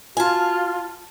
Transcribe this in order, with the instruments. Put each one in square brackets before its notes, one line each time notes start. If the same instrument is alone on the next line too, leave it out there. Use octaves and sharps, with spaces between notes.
[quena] F4 [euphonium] F#4 [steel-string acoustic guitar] G#5 A5